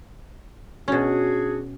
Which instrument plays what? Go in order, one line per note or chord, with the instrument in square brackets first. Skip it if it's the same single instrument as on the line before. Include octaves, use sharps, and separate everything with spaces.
[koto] B2 C#4 [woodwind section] D4 F#4 G#4